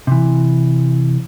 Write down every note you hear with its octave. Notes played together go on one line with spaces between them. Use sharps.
C3 E3